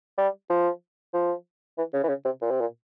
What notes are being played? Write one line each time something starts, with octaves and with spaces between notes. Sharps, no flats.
G3
F3
F3
E3
C#3
E3
C#3
C3
A#2
C3
A#2